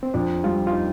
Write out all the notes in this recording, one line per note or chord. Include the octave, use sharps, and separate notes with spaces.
C4
F2 D4
G3 F4
F4
D#4